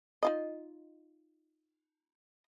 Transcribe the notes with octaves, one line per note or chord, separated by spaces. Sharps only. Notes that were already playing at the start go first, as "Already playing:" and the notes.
D#4 F4 D#5